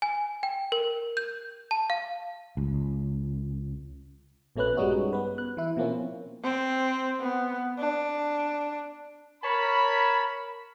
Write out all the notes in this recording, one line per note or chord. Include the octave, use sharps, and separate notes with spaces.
G#5
G5
A#4
G6
A5
F5
C#2
A#1 B2 A3 C#4 B4 F#6
G2 G3 G#3 C#4 D#4 F#4
B3 B4
F#6
E3 E4
B2 F3 A#3 C4 C#4
C4
B3
D4
A#4 C#5 A5 B5